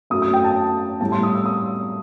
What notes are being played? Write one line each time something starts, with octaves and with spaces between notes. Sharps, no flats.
F#2 F#3 A3 D#6
D#6
G5
A5
A2 G3 A5
C6
D#6
E6
D#6